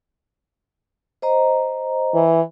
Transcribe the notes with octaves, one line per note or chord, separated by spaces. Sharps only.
C5 D#5 A#5
E3